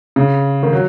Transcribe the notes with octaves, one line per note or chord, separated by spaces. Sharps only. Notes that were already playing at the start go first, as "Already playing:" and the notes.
C#3
D#3
F#3